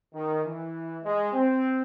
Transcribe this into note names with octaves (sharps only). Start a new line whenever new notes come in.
D#3
E3
G#3
C4